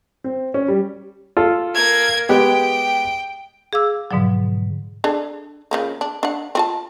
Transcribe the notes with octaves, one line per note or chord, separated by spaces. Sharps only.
C4
C#4
G3
F4 A4
A#3 G#6
G#3 B3 G4 G5
G#4 F5 D6 E6
G#2 B2 D3 F3 F#3
D4 G#4 A4
C#3 F3 A#3
D4
D4 F#5
C4 F4 A5